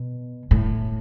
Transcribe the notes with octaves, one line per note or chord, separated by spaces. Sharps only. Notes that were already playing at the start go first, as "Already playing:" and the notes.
Already playing: B2
A2